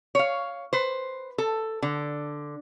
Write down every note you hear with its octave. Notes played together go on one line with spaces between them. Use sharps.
C#5 F5
B4 C5
A4
D3